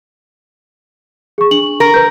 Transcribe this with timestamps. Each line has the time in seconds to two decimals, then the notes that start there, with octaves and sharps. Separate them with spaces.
1.38 G#4 C#6
1.51 D4 F#7
1.80 A#4
1.94 B4 G6